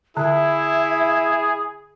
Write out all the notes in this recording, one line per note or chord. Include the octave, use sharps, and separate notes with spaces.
D3 E4 G#4 E5